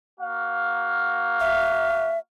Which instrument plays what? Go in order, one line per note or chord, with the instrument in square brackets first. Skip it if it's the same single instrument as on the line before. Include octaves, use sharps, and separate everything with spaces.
[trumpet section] A#3 F#4 F5
[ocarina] E5